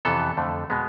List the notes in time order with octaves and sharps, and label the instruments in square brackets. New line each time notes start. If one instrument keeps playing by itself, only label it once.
[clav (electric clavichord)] F2 C3 E3 B3 A4
F2 D3 A3
B2 G#3 B3